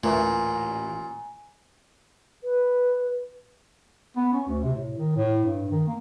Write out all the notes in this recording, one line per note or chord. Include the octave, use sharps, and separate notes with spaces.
A1 D2 A#2 E3 A3 G#5 A#5
B4
B3
C#4
D2
C3
A2
D#3
A2
G2
D#3
A#3